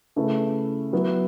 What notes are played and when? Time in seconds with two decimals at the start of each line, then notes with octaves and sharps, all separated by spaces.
0.16 C#3 A3 E4 B4
0.93 F#3 B3 E4